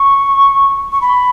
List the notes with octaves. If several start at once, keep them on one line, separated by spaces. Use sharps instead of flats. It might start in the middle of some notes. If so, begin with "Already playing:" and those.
Already playing: C#6
C#6
B5